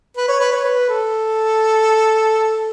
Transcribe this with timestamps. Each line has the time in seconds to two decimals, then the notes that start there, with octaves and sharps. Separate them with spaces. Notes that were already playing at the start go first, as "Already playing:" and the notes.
0.17 B4
0.28 C#5
0.40 B4
0.52 C#5
0.64 B4
0.89 A4